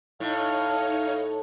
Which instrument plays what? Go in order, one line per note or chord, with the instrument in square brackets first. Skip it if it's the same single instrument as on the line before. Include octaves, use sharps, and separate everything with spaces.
[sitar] A2 [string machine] D#4 C#5 [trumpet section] F5